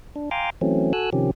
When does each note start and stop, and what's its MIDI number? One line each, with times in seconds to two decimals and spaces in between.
0.16 0.30 62
0.31 0.50 77
0.31 0.50 79
0.31 0.50 80
0.31 0.50 82
0.31 0.50 84
0.31 0.50 86
0.61 0.92 52
0.61 0.92 54
0.61 0.92 57
0.61 0.92 60
0.61 0.92 61
0.93 1.10 66
0.93 1.10 69
0.93 1.10 80
0.93 1.10 88
0.93 1.10 90
1.13 1.31 48
1.13 1.31 51
1.13 1.31 53
1.13 1.31 61
1.13 1.31 67